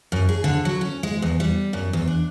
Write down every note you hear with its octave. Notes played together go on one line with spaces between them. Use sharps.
F#2
G#4
D3
F#3
C#4
G#3
E2
G3
F#2
E2
D4